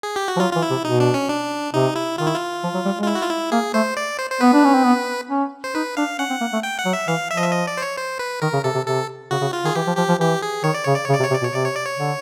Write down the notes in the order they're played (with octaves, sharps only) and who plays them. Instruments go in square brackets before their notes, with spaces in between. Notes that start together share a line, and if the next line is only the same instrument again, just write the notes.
[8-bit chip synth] G#4
G4
F#4
[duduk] F3
[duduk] F#3 [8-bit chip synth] F4
[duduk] E3 [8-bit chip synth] F4
[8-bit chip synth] E4
[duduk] C3
[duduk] B2 [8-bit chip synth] D#4
[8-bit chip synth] D4
C#4
D4
[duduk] C3 [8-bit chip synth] D#4
[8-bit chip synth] E4
[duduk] D#3 [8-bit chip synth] F4
[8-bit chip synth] E4
F4
[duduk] F3
F#3
G3
G#3
[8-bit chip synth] F4
E4
F#4
F4
E4
[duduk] A#3 [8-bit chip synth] G#4
[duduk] A3 [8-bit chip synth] C5
[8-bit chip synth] D5
C5
C5
[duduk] B3 [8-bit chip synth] B4
[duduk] D4
C#4
C4
B3
C#4
[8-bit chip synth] C5
[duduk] D#4 [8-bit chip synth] B4
[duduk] D4 [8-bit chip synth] F5
[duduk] C#4 [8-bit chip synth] F#5
[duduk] C4
A#3
A3
[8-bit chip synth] G5
F#5
[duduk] F#3
[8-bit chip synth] E5
[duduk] E3 [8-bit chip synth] F5
[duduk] F3 [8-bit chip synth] E5
[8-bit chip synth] D#5
E5
D#5
D5
C5
C#5
C5
B4
[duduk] D#3 [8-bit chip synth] A#4
[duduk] C#3
[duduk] C3 [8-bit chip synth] A4
[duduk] C3
[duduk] C3 [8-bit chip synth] A4
[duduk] C#3 [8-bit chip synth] F#4
[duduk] C#3
[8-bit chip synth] F4
[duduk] D#3 [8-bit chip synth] G#4
[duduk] E3 [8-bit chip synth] G4
[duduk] F3
[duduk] F3 [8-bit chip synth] G4
[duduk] F3
[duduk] E3 [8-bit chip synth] G4
[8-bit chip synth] G#4
[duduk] D#3 [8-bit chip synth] C#5
[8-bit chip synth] D5
[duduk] C#3 [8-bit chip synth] C#5
[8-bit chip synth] D5
[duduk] C#3 [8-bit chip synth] C#5
[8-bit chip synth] D5
[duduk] C3
[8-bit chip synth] C#5
[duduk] C3
[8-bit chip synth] D5
[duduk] B2 [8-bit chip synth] C#5
[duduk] C3 [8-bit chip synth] D5
[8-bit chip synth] C#5
D5
C#5
[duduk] D3